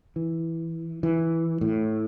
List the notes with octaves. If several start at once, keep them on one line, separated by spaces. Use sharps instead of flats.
E3
E3
A2